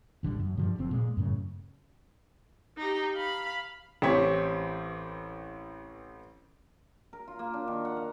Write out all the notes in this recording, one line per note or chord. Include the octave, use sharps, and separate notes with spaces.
A1 D3 F3 G3
F#2
G2 D3 F3 G3
F1 F2 C4
A#2 G#3
F#2 A2 C#3
D#4 G4
F5 B5
A1 E3 C4 G4 C#5 B6
A#4
F4
A#3
D4
D#3
F#5
F5